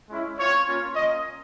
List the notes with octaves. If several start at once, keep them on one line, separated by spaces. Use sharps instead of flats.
G#3 C#4 E4
C4 F4 C#5
A#3 C#4 F4
A#3 C#4 F4 D#5